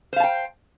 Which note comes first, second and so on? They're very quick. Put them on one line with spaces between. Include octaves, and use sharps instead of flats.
C5 F5 A5 G5